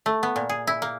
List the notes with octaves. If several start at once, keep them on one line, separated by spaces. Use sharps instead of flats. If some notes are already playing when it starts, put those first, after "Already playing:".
A3
B3
A#2
G#4
E4
A#3